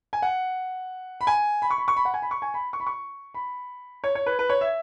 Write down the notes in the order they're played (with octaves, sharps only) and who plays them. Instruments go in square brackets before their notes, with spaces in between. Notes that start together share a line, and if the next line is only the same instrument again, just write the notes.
[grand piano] G#5
F#5
B5
G#5
B5
C#6
B5
C#6
B5
F#5
G#5
B5
C#6
G#5
B5
C#6
B5
C#6
B5
C#5
C#5
B4
B4
C#5
E5